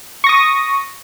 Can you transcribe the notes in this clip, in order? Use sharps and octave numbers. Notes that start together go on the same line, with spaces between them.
C#6 D#6 A#6